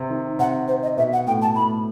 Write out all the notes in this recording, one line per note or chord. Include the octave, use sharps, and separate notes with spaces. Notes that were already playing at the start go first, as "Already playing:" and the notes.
Already playing: C3
D#3
C3 F#5
C5
D#5
B2 E5
F#5
A2 G5
A5
A2 B5